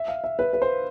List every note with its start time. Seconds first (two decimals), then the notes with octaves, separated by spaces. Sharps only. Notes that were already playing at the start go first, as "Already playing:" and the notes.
Already playing: E5
0.08 F5
0.24 E5
0.39 B4
0.53 B4
0.62 C5